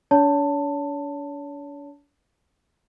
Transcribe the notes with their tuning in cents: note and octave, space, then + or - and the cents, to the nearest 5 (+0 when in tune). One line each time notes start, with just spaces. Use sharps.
D4 -40 C#5 +35 A5 +15